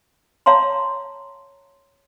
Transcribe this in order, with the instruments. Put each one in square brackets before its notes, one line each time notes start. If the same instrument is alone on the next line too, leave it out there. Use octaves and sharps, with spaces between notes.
[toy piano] C#5 F5 A5 A#5 C6